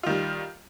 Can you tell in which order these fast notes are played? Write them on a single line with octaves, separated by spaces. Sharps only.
F4 D#3 G3